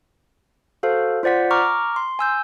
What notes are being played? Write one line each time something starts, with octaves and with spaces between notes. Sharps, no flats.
F#4 A4 C5 F5
F4 C5 D5 F#5 B6
A#5 C#6 D6 F6
C6
G#5 E6 G6